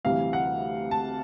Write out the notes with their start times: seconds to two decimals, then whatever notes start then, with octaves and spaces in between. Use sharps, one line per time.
0.04 D2 C3 E3 G3 F5
0.33 F#5
0.91 A5